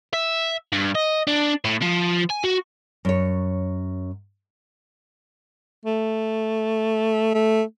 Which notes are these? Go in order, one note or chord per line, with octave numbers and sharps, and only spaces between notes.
E5
G2
D#5
D4
A2
F3
G#5
F#4
F#2 C#5
A3
A3